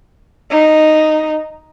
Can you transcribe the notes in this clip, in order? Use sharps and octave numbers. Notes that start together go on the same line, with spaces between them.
D#4